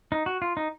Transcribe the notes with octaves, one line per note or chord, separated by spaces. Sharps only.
D#4
F#4
F4
D#4